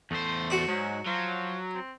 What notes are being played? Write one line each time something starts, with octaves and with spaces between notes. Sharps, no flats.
E2 A3 C5
F#4 D5
G#2 F#3
F3 F#3
C4